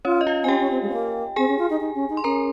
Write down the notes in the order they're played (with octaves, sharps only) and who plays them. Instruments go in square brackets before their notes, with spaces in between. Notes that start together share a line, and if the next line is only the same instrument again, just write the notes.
[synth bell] C#4 C#5 [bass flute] F4
[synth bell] D#5
F4 F5
[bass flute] C4 [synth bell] G#5
[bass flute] C#4 [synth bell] G4 G5
[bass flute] C#4
C4
G#3
C4
A#3
[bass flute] C4 [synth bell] G#4 G#5
[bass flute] C#4
F4
D#4
D#4
C#4
D#4
[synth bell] C6
[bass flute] C#4 [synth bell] A#4 A#5